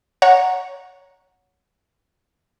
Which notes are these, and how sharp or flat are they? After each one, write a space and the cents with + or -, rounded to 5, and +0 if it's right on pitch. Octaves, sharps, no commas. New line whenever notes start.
C#5 +10 F#5 -10 A#5 +0